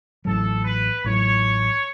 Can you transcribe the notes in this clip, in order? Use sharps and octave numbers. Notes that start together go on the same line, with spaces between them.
A1 A2 F#3 A4
B4
A1 A2 F#3 C#5